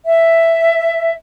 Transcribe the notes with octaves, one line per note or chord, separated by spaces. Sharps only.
E5